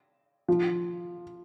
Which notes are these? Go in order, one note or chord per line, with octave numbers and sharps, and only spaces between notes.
F3